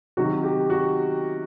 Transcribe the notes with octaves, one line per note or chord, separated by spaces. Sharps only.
C3 D#3 F#3 F#4
G4
F#4